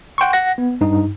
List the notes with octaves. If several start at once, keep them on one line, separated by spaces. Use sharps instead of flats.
F#5 G5 C6 C#6
F#5 A#6
B3
G2 D#4